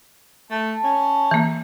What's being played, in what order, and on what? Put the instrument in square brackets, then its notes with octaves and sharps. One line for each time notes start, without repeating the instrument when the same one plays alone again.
[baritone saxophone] A3 [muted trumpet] A5
[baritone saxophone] C#4
[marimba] E3 A#3